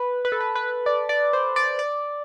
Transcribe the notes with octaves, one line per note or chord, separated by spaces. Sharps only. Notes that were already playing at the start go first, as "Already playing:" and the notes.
Already playing: B4
B4
A4
B4
B4
D5
D5
C5
D5
D5